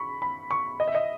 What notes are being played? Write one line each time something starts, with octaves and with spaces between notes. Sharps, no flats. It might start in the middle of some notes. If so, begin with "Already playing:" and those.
Already playing: B5 C#6
B5
C#6
D#5
E5
D#5